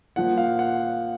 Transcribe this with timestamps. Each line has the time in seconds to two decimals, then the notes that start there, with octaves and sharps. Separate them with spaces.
0.16 A#2 F3 F#5
0.38 F5
0.59 F#5